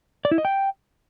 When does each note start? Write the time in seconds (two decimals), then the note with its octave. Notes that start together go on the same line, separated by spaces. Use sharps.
0.25 D5
0.31 E4
0.38 D#5
0.45 G5